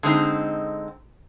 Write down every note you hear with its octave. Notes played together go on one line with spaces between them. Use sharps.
D3 G#3 C4 D#4